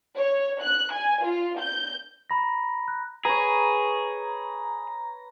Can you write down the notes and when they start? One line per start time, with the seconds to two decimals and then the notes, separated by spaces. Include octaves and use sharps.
0.17 C#5
0.62 F#6
0.93 G#5
1.24 F4
1.59 G6
2.30 A#5 B5 A#6
2.88 F#6
3.25 G#4 B4 C#5 A#5